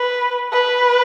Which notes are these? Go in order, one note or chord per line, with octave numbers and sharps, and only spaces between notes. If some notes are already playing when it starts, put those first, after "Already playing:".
Already playing: B4
B4